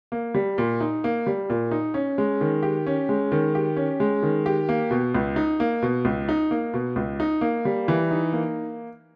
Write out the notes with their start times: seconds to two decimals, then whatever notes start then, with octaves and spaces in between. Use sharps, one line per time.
0.12 A#3
0.35 G3
0.58 A#2
0.81 D#4
1.04 A#3
1.27 G3
1.50 A#2
1.71 D#4
1.94 C#4
2.18 G#3
2.41 D#3
2.63 G4
2.86 C#4
3.09 G#3
3.32 D#3
3.55 G4
3.77 C#4
4.00 G#3
4.23 D#3
4.46 G4
4.69 A#3
4.91 B2
5.15 C#2
5.36 D#4
5.60 A#3
5.82 B2
6.05 C#2
6.29 D#4
6.51 A#3
6.74 B2
6.96 C#2
7.20 D#4
7.41 A#3
7.65 G3
7.88 E3
8.11 D#4
8.33 A#3